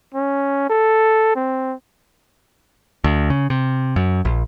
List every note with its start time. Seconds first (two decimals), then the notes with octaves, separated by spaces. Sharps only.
0.14 C#4
0.70 A4
1.36 C4
3.04 D2
3.30 C#3
3.50 C3
3.96 F#2
4.25 A#1